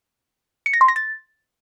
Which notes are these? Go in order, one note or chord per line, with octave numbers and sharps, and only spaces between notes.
C#7
A#6
C6
A#6
A6